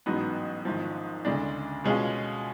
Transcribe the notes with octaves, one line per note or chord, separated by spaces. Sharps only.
A1 G#2 F#3 B3
G#1 G#2 F3
D2 C#3 G#3 D4
B2 G#3 C#4 F4 G#4